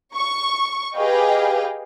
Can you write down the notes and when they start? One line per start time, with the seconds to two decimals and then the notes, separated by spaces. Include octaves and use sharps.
0.15 C#6
0.95 G4 G#4 B4 D#5 F5 G5